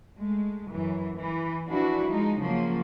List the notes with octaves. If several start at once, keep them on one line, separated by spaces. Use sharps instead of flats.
G#3 A3
F#2 E3
E3
E3 F3 D4 E4 F#4
F3 G#3 D#4
C#3 F3 F#3 A#3